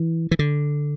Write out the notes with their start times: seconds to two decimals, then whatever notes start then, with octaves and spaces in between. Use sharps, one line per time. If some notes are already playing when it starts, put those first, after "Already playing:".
Already playing: E3
0.31 E3
0.39 D3